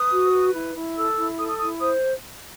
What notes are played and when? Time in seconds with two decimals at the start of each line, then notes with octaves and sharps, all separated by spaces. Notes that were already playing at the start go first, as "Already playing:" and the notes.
Already playing: B4 D#6
0.12 F#4
0.32 B4
0.54 E4
0.75 E4
0.96 A4 E6
1.17 E4
1.38 A4 D#6
1.49 D#6
1.59 E4 D#6
1.80 C5 D#6